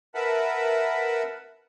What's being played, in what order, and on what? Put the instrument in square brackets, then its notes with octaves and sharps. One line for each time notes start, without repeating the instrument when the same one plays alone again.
[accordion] A#4 B4 E5 F#5 A5 B5